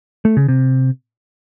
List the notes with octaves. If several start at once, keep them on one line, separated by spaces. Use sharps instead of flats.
A3
C#3
C3